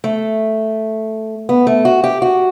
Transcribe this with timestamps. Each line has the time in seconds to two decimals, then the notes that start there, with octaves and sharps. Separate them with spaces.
0.04 A3
1.49 B3
1.67 A3
1.85 F#4
2.04 G4
2.22 F#4